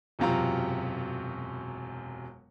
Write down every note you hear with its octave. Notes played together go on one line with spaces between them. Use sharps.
E1 F#2 C3 F4 A#5